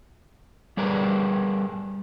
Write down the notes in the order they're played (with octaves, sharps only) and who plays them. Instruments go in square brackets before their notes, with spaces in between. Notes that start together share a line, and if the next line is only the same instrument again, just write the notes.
[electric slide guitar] G3 G#4 A#4 B4 D5